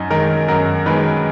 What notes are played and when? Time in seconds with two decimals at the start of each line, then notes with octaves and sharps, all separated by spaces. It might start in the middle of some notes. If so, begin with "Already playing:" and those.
Already playing: F#2 D#4
0.10 D#3 G#3 A#4
0.48 F#2 A#4
0.86 D#3 G#3 B4